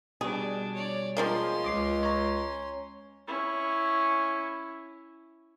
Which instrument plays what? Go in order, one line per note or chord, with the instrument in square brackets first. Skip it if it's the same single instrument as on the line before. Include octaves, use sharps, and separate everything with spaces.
[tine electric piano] B2 G3 [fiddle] D4 [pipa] G#4
[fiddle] C#5 D5
[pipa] F3 G#3 A#3 [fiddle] C#4 C6
[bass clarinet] C#2 [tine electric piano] D#5 D6 C7
[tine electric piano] C#5 A#5
[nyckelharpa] C#4 E4